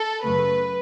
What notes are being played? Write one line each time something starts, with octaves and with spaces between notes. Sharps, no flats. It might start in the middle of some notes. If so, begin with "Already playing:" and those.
Already playing: A4
F#2 C#3 F#3 A3 B4